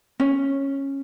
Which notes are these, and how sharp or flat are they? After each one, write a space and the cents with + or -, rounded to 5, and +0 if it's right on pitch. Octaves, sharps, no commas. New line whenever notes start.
C#4 -15